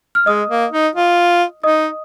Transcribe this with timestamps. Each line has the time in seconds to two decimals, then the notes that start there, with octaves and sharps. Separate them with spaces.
0.15 F6
0.26 G#3 D#5 D#6
0.50 A#3
0.72 D#4
0.95 F4
1.63 D#4 D#5 D#6